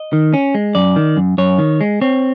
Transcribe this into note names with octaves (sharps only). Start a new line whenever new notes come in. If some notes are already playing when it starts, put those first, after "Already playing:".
Already playing: D#5
D#3
C#4
G#3
F#2 D5
D#3
F#2
F#2 C#5
D#3
G#3
C4 C#5